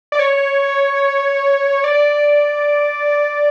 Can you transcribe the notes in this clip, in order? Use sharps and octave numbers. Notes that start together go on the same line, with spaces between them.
D5
C#5
D5